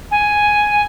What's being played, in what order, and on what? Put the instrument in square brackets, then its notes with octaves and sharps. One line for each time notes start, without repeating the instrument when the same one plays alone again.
[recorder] G#5